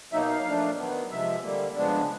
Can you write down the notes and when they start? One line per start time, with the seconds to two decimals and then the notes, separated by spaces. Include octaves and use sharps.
0.12 B2 F#3 A#3 D#4 E5
0.29 F5
0.45 A#2 F3 A3 D4
0.77 D#3 F#3 B3
1.11 C3 F3 G#3 E5
1.42 D3 G3 A#3
1.75 C#3 F3 G#3 B3 D4